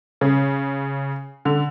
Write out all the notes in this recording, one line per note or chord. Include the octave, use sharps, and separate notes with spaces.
C#3
D3